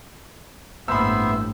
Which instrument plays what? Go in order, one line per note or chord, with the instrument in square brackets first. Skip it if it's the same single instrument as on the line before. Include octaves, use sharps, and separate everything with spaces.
[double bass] A1 G2 [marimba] A#3 [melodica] B3 C5 E5 [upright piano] B5 E6